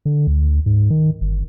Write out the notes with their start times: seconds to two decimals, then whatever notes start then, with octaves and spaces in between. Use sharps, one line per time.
0.05 D3
0.27 D2
0.66 G#2
0.90 D#3
1.21 G1